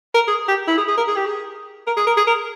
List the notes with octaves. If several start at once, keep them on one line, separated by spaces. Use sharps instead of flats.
A#4
G#4
G4
E4
G#4
G#4
A#4
G#4
G4
G#4
A#4
G#4
A#4
G#4
A#4